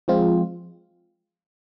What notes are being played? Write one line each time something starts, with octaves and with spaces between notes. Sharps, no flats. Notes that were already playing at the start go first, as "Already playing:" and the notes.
F3 G#3 C4 F4